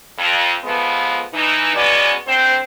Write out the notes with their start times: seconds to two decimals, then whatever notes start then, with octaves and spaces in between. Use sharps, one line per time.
0.18 F2
0.65 F3 G#3 A3 B3
1.34 E3 D#4
1.76 B2 G#3 B3 C#4 F#4 D5
2.27 D2 C4 C5